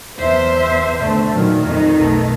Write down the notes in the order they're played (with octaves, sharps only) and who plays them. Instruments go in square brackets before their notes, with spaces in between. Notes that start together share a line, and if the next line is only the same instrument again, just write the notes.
[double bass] E2 [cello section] C5 E5
[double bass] D3 A3
[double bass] A#2 D#3 [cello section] F#3
[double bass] F2 [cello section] D#3
[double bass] B1 A3